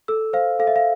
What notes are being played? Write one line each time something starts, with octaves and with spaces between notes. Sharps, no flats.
A4 E6
C5 F5
A4 F5
E5
F5